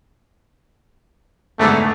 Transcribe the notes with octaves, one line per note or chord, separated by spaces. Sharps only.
E2 G#2 D3 A3